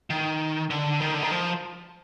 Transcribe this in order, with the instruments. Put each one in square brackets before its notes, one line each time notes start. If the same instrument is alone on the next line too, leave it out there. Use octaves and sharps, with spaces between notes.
[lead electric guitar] D#3
D3
D#3
D3
D#3
F3